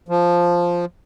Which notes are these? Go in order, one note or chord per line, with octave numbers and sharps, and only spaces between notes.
F3